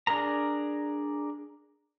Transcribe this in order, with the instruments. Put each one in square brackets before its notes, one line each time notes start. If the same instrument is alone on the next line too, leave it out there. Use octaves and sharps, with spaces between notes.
[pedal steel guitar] D4 G#4 A#4 A#5